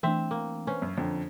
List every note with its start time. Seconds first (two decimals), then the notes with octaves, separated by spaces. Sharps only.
0.03 E3 A3 C4 D4 E5
0.31 A#3
0.67 C#4 B4 C5
0.82 F#2
0.97 F2 D3 G5 A#5